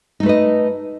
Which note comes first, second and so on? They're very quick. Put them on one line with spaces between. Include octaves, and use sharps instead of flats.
D#4 A3 B4 D#5